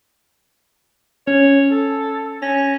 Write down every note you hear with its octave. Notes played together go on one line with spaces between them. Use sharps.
C#4 C#5
A4
C#4 A#6